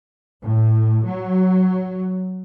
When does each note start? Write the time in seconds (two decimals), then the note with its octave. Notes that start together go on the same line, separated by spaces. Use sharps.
0.42 A2
1.05 F#3